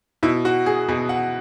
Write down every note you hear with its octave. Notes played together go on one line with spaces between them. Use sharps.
B2 E4
F#4
G#4
B2 G#4
F#5